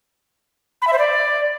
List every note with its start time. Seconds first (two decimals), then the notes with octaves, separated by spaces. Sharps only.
0.82 B5
0.87 E5
0.93 C5
0.98 D5